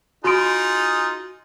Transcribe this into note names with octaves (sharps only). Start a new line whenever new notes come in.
D#4 F4 F#4 G#4 C6 D7